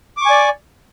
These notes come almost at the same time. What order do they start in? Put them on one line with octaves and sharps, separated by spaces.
D6 C#6 G#5 D5